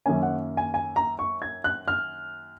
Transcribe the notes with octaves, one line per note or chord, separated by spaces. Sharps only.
F#2 D#3 A#3 C#4 G#5
F#5
G#5
G#5
A#5
C#6
G#6
F#6
F6